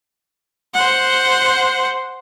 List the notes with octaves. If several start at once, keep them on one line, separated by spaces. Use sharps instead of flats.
C5 F#5